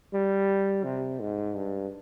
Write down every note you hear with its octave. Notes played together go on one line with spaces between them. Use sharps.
G3
C3
G#2
G2